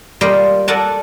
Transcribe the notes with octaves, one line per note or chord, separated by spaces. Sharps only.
G3 A#3 F4 G4 D#5
A4 A#4 D5 F#5 G#5 A5